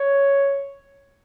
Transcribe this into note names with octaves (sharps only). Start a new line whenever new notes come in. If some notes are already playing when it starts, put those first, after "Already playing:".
Already playing: C#5